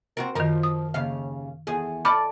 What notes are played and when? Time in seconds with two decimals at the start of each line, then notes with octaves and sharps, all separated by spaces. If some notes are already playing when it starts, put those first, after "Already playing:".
0.17 C4 F#4 A#4
0.35 F#2 D#3 F3 A#4
0.63 D#6
0.94 D#2 C#3 F5
1.67 E2 G#4
2.05 A4 D5 B5 D6 F6